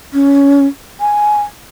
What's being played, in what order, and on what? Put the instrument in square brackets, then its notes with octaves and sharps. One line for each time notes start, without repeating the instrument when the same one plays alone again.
[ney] C#4
G#5